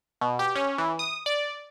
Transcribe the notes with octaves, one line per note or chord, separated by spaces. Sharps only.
B2
G4
C#4
E3
D#6
D5